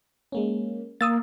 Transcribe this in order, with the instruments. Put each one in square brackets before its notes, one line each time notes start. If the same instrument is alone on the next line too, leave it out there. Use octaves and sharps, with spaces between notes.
[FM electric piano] G#3 A#3 C#4
[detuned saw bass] A#3 [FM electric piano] F5 [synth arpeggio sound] D#6 E6 A6